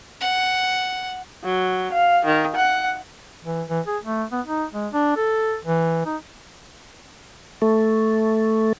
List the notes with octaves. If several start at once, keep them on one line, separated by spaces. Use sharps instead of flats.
F#5
F#3
F5
D#3
F#5
E3
E3
G#4
A3
B3
D#4
G#3
D4
A4
E3
D#4
A3